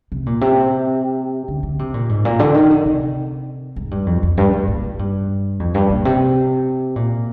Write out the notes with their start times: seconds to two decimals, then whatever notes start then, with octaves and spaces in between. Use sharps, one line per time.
0.12 C3
0.26 A#2
0.41 C3
1.48 D3
1.63 D3
1.79 C3
1.94 A#2
2.09 G#2
2.25 A#2
2.39 D3
2.54 D#3
2.70 D3
2.85 C3
3.76 G#2
3.91 G2
4.06 F2
4.23 F2
4.37 G2
4.53 G#2
4.68 A#2
4.84 G#2
4.99 G2
5.60 F2
5.74 G2
5.89 A#2
6.05 C3
6.96 A#2